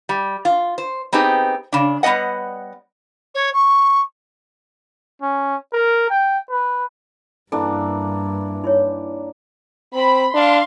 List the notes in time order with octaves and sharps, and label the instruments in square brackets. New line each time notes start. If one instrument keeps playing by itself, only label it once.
[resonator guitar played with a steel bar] G3
F4
C5
B3 C4 D#4 G4 G#4
C#3 D4
G3 B3 C#4 D#5 F#5
[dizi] C#5
C#6
[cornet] C#4
A#4
G5
B4
[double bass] G2 [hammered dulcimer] E3 A#3 D4 [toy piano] A4
[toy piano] D#4 E4 C#5
[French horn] C4 [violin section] B5
[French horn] D4 [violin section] F5 C6